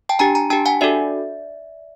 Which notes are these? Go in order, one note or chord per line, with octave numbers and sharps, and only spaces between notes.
G5 A5
D4 G4 G#5 A#5
G#5 A#5
D4 G4 G5 A5
F#5 G#5
D4 F#4 A4 D5 E5